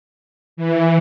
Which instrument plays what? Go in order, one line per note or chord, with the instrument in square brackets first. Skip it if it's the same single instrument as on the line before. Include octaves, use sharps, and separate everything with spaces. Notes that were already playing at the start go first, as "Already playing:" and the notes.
[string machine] E3